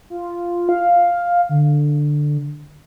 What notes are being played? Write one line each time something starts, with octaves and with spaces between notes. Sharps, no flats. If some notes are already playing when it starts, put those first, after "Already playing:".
F4
F5
D3